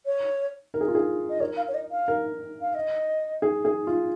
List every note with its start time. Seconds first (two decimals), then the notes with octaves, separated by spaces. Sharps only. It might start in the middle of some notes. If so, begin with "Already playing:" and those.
0.06 C#5
0.74 A#4
0.81 G#4
0.88 F4
0.95 G#4
1.30 D#5
1.40 A#4 C#5
1.57 F5
1.68 C#5
1.74 D#5
1.91 F5
2.08 A#4
2.61 F5
2.75 D#5
3.42 G#4
3.65 G#4
3.87 F4